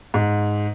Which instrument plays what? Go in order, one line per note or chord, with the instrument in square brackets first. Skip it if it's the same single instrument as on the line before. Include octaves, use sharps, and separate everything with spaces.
[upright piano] G#2